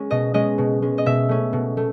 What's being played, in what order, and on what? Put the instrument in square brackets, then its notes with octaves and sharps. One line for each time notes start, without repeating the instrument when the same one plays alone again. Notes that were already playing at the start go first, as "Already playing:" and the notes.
Already playing: [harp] G#3 C#4
B2 D#5
G#3 C#4 D#5
B2
G#3 C#4
D#5
B2 E5
A3 C#4
B2
A3